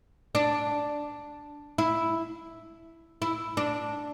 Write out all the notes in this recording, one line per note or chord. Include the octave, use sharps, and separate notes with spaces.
D4
E4
E4
D4